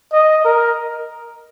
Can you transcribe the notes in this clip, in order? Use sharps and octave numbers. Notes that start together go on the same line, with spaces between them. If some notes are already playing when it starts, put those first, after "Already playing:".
D#5
A#4